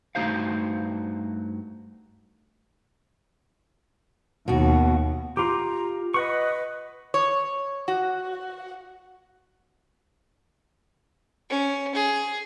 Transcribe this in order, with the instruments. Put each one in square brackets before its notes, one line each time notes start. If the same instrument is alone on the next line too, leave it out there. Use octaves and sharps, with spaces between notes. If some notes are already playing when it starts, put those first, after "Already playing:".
[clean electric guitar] G2 A3 D#4 F#4 C5 F5
[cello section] D#2 [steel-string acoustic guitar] B2 F#4
[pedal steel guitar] F4 G4 [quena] A#5
[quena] B4 [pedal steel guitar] D#5 F#5 C#6
[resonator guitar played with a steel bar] C#5
F#4
[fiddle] C#4
G#4